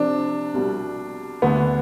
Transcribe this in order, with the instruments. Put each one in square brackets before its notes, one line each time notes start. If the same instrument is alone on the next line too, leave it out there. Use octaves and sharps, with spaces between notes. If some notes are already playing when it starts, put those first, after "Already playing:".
Already playing: [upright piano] C3 F3 C4 [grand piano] D4
[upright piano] C2 B2 G3
[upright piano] D2 D3 A3 [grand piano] B3